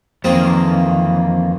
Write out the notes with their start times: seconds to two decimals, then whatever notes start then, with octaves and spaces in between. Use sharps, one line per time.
0.24 F2 D#3 E3 A#3 C4 F4 G#4